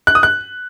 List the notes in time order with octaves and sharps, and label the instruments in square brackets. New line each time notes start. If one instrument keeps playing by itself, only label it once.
[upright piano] F#6
D#6
F#6